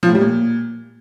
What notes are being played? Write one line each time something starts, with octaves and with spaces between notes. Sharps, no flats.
F3
A2
G3
A#2